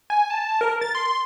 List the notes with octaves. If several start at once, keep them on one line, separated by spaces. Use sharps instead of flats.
G#5
A5
A#4
A6
C6